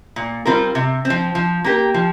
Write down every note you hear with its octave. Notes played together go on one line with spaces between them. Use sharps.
A#2
G3 C4 F4 A#4
C3
C4
F3
F3
A#3 G4 A#4
F3